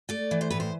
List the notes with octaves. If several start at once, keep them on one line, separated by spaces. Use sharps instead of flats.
A3 D5
E3
C5
A2 B4
C5